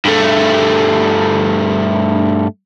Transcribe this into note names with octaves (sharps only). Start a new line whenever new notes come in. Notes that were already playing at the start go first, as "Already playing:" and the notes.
G2 A3